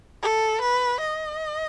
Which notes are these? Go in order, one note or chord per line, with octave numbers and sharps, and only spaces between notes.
A4
B4
D#5